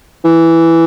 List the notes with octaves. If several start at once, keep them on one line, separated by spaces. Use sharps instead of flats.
E3